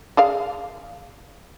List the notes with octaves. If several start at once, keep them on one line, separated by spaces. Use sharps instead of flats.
G#4 D5 F5